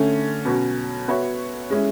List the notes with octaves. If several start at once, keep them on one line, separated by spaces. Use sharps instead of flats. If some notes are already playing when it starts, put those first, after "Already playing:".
Already playing: D3 A3 C#4
B2 F#3 C#4 F#4
B3 F#4 C#5 E5
G#3 C#4 E4